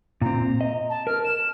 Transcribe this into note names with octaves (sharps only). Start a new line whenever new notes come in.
A#2 C4 A#5
D#5
A5
A#4 F6
E7